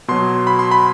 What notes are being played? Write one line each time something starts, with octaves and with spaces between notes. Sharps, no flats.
B2 F#3 C6
B5
C6
B5